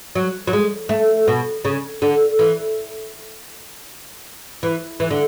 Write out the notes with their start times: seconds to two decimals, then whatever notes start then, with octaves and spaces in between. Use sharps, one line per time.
0.15 F#3
0.47 F#3
0.53 G#3
0.89 A3
1.28 B2
1.65 C#3
2.02 D3
2.39 E3
4.63 E3
5.00 E3
5.11 D3